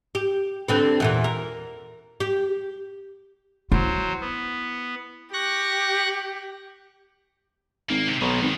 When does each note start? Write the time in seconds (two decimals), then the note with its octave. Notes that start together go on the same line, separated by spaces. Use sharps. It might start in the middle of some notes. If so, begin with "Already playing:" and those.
0.15 G4
0.68 D3 C4 B4
1.00 E2 A#2 E3
1.24 A#4
2.20 G4
3.72 F#3 E4 C5
4.21 B3
5.33 G4 C#6 F#6 A#6
7.90 G#1 A#3
8.08 C3 G4
8.21 B1 B2 D#3
8.42 G#1